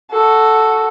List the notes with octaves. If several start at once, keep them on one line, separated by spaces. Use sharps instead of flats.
F#4 A4